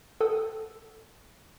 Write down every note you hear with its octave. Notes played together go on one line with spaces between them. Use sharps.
A4 F#5 G5 D#6 E6